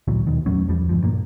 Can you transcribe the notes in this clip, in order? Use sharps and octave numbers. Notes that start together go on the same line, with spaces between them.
D2 A#2 E3 F#3
D#2 B2 D#3
E2 A2 F#3 C#4
E2 F3 G3
D2 G2 F3
G2 A#2 A#3